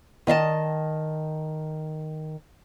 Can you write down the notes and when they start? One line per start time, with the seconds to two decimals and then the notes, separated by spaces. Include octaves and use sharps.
0.27 D#3 D#5 E5 A5